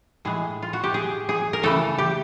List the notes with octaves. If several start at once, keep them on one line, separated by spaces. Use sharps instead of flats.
A2 E3 G#3 G#4
F4
F#4
G4
G#4
G#4
A#4
C#3 E3 A3 A4
G4